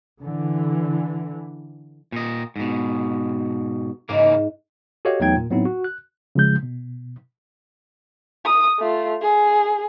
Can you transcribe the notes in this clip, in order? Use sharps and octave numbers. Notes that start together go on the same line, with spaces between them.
D3 E3
A#2 D#5
G#2 B2
G#2 C#3 E3 A#3
F#4 G4 A4 C#5 D#5 F5
E2 F#3 A3 D#4 G5 G#6
A#2
A2 F#3 B3 C4 D#4 E4
F#4
F#6
C#3 F3 G#3 G6
B2
D#6
A3 F4
G#4